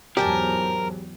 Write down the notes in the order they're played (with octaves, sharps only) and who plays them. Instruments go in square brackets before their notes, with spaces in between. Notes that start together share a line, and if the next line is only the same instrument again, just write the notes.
[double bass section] E2 G#2 F#3 [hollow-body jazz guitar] G4 [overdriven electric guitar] A#4 [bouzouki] C5 G#5 A5